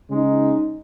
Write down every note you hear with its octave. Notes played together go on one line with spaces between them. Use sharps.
C#3 G#3 D#4